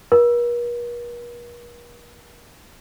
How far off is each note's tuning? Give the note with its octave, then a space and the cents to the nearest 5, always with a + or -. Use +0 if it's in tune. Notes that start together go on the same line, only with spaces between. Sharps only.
A#4 +45